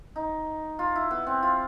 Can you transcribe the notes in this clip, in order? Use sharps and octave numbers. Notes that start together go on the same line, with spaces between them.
D#4
F4
E4
B3
C4
F4